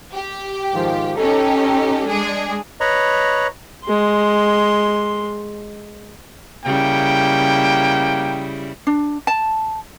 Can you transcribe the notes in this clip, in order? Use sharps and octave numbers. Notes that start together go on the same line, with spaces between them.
G4
G#2 D#3 F3
C#4 D#4 G4 A4
G#3 D4 G#4
B4 C#5 D#5 A#5 B5 C#6
G#3 C6
C#3 G3 A#3 E4 G5
D4
A5